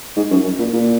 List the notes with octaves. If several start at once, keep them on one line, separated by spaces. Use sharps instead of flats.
G#2
F#2
F#2
A#2
A#2